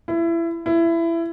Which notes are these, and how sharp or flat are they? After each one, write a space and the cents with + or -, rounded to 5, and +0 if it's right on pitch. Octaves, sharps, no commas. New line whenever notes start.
E4 +25
E4 +20